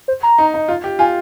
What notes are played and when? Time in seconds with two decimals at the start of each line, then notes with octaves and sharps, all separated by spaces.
0.08 C5
0.23 A#5
0.38 D#4
0.54 D#4
0.68 F4
0.84 G4
0.99 F4 G#5